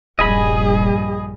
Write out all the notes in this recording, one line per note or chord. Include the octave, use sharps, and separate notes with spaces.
D#1 A#1 G2 G3 G#4 D#5 G#5 B5